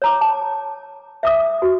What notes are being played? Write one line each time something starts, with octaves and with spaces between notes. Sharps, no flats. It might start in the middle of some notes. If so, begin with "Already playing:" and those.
C#5 A#5 D6
A5
E5 D6 D#6
F#4